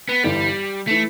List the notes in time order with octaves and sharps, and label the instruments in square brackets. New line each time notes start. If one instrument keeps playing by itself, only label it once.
[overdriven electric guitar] B3
[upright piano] G1 G2 E3 [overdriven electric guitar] G3
[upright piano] E3 [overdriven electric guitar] A3